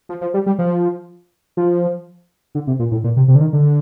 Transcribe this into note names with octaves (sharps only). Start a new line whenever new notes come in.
F3
F3
G3
G3
F3
F3
D3
C3
A#2
A2
A#2
C3
C3
D3
D#3
D3